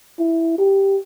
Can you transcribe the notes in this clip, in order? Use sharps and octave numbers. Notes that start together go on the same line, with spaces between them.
E4
G4